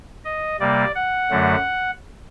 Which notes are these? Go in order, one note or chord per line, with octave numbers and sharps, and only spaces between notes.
D#5
C3 G3 A#3 D5
F#5
F#2 D3 F#3 A3